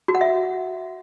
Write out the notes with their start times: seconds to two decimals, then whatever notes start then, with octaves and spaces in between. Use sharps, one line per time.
0.08 F#4
0.15 F#5
0.21 E5